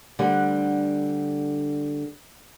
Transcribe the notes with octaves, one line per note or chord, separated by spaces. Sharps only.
D2 D3 G3 F#5